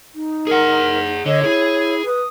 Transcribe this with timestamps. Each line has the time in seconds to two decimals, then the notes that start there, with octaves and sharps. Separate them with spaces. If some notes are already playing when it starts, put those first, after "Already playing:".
0.15 D#4
0.47 G#4 A#4 F#5
1.26 D3 C#5 D#5
1.44 E4 G#4
2.05 B4 D#6